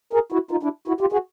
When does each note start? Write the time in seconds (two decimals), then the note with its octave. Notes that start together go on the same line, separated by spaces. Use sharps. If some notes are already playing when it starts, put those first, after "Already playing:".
0.13 G#4 A#4
0.32 E4 F#4
0.51 D#4 F4
0.63 D4 E4
0.88 E4 F#4
1.01 F4 G4
1.12 F#4 G#4